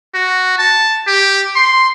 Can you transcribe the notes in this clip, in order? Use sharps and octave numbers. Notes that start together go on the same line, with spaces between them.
F#4
A5
G4
C6